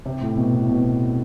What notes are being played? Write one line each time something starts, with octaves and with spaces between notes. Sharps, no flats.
C3
A2
B2
A2
B2